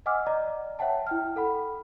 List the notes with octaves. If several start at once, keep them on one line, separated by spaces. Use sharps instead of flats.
D#5 F#5 G#5 D6 E6 F6
D5 D#5 A#5
C#5 E5 F#5 G5 A5
E4 G5 F6
A4 F#5 B5